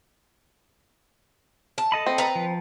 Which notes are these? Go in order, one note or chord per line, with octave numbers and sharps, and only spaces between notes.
A5
A4 D#5 B5
C4
B4 A#5
F3